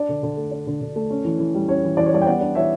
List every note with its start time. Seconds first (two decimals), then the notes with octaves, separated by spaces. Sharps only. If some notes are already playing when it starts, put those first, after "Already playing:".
Already playing: D4 D5
0.09 D3
0.23 D3
0.37 A3
0.51 D4
0.67 D3
0.81 D3
0.96 A3
1.10 C#4
1.25 E3
1.39 E3
1.55 G3
1.68 C#4 C#5
1.84 E3
1.97 E3 D5
2.06 C#5
2.12 G3 D5
2.21 G5
2.27 B3 D5 F#5
2.41 D4
2.55 E3 C#5 E5